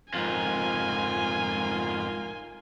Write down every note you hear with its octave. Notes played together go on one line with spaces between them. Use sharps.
F2 G#2 F4 A#4 G#5